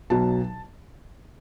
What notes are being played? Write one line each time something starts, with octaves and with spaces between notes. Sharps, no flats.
B1 B2 F#3 A5